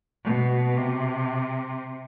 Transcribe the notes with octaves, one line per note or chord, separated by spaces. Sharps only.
B2
C3